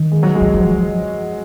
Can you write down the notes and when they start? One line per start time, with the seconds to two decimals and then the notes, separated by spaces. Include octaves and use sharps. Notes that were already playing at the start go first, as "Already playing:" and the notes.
Already playing: D#3
0.12 G#3
0.23 F#3
0.35 G#3
0.42 D#3
0.53 F3 F#3